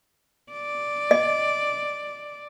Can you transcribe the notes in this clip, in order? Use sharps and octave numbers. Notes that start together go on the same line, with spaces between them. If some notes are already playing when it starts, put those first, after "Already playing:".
D5
D#5